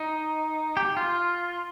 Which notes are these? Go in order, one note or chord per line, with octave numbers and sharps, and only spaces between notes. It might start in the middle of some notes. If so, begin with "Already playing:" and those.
Already playing: D#4
G4
F4